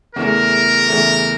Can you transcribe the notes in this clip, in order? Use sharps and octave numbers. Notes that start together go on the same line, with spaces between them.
E2 C#3 E3 A3 A#4
E2 C#3 E3 A3